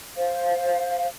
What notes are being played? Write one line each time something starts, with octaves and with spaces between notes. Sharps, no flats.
C5 F5